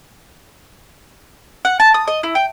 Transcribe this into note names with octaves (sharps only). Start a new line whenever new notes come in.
F#5
A5
D#6
D#5
E4
G5